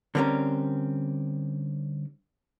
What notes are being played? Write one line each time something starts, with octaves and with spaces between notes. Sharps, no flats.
D3 G3 A#3 C4 C#4 A#4